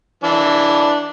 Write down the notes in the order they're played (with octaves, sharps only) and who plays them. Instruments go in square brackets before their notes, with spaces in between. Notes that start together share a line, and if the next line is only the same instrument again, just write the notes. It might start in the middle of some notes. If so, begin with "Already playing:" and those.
[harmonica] E3 D4